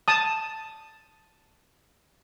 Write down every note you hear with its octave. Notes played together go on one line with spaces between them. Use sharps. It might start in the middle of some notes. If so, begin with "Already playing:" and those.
A5 D#6